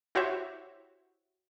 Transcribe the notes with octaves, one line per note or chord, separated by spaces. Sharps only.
E4 F#4 G4 C5 C#5 E5